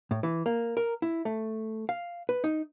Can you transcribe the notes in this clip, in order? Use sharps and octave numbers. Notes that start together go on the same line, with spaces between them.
A2
E3
A#3
A#4
E4
A3
F5
B4
D#4